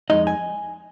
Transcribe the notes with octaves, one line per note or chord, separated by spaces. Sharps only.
F2 C#3 G#3 D#4 D#5
G#5